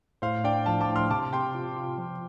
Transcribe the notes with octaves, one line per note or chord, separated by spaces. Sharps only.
A2 C5 F5
D4 D5 G5
F3 F5 A5
A5 D6
A2
C6 F6
C3 A5 D6
C3 G5 C6
F4
F4
F3